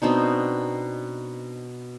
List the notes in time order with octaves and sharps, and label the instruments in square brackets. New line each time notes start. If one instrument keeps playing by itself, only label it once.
[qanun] B2 C4 D4 D#4